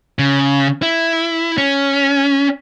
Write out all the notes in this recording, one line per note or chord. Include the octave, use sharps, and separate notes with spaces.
C#3
E4
C#4